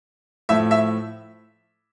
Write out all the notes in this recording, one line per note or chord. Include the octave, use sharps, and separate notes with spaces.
A2 F3 A3 E5
E5